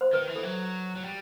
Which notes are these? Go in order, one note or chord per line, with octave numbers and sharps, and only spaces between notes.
C5
D#3 B4
E3
A4
F#3
F#3
G3